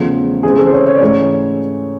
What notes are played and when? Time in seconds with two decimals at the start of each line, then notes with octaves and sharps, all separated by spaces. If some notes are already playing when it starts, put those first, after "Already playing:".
Already playing: E2 C#3 F3 A3
0.43 C#3 E3 G#3 C4 G#4
0.58 A4
0.67 C5
0.73 C#5
0.86 C#5
0.96 D5
1.01 G#2 E3 A3 C#4 C#5